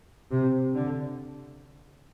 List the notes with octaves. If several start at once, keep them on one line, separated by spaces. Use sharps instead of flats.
C3
D3